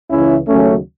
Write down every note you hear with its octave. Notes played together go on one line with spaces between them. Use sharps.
C#2 C#3 E3 C#4 E4
D#2 C#3 F#3 A3 C#4